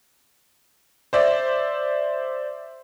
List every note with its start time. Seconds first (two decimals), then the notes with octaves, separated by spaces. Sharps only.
1.13 C5 D5 E5